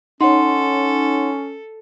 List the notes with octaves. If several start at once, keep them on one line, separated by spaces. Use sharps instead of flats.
C#4 D#4 A4 C#5 F#5 C6